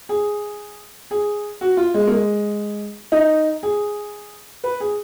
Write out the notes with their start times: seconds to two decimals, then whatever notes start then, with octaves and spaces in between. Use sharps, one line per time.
0.09 G#4
1.11 G#4
1.61 F#4
1.77 F4
1.94 G#3
2.07 A#3
2.12 G#3
3.12 D#4
3.63 G#4
4.64 B4
4.80 G#4